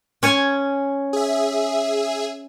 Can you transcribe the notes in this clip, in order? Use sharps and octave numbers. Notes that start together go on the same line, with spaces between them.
C#4 C#5 G#5
G#4 E5